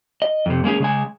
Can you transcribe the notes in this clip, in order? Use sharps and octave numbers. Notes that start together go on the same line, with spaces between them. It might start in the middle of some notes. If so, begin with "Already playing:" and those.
D#5
F2 C3
G#3 A#3 C#4 G#4
C#3 G#3 G#5